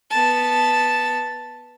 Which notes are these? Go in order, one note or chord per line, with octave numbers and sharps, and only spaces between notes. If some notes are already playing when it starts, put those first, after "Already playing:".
B3 A5